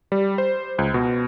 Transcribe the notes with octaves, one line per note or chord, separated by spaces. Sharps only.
G3
C5
C#2
B2